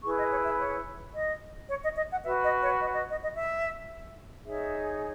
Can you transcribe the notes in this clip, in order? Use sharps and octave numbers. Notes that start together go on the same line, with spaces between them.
E4 G#4 B4 C#6
D#5
C#5
E5
C#5
D#5
C#5
D#5
D#5
F#5
F#4 B4 E5
D#5
C#5
D#5
D#5
D#5
D#5
E5
D#4 G#4 C#5 E5